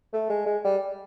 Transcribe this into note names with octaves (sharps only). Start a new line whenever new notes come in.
A3
G#3
G#3
G3